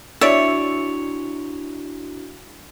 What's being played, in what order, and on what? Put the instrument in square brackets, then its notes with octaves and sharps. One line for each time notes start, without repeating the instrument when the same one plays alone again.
[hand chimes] D4 E4 F#4 [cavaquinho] C#5 [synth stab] D5 E5